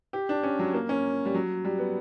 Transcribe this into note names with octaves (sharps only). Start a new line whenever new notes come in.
G4
D4
C#4
F#3
A#3
C#4
G3
F#3
G3
B3